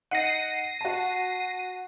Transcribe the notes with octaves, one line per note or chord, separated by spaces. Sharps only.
D#4 F#5 A#6 C7 D#7
F#4 A5